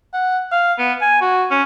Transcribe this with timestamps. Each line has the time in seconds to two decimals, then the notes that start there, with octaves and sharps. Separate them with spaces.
0.13 F#5
0.52 F5
0.79 B3
1.01 G#5
1.21 F#4
1.51 C#4